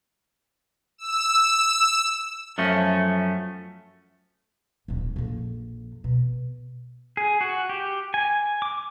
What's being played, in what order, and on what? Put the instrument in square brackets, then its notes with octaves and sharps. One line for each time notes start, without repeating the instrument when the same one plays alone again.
[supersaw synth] E6
[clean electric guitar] F#2 F3 A3 C#4
[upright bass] D#1 G3
A#1 F2
B2
[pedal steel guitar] G#4
F#4
G4
G#5
D6